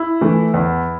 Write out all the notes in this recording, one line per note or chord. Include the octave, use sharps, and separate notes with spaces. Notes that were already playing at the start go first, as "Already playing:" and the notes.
Already playing: E4
E3 A3
E2